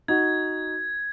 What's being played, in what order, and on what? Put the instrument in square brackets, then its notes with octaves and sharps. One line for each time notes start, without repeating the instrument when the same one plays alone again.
[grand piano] D#4 F#4 [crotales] G#6